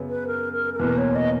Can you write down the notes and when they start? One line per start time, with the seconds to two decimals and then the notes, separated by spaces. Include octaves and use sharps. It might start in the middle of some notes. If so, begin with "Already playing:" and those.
Already playing: F#2 C#3 F#3 B3
0.09 B4
0.27 A#4
0.53 A#4
0.74 A#4
0.80 E2 B2 A#3 B4
0.98 C#5
1.15 D#5